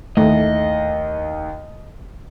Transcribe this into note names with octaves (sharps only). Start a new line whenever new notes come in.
D#2 A3 D#5